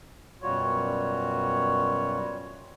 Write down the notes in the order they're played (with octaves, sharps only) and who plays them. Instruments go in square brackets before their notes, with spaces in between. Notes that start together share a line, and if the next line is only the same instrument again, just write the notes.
[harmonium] F#2 B2 G3 F4 F#4 C#5